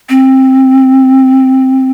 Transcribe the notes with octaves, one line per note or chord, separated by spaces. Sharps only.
C4